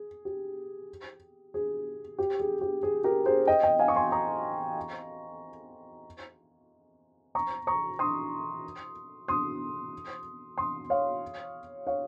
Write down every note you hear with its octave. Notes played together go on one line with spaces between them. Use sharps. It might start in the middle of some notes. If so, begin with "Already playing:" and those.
Already playing: G#4
G4
G#4
G4
G#4
G4
G#4
G4 A#4
G#4 C5
D#5 G5
D#5 G5
F5 G#5
C#6
G#5 C6
A#5 C#6
A#5 C#6
A#5 C#6
C6 D#6
C6 D#6
C6 D#6
C#5 F5
C#5 F5